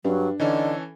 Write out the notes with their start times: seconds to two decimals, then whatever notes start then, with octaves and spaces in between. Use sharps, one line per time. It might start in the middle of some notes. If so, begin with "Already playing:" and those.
0.04 G2 F#3 D4
0.40 D3 E3 C#4 D#4 A4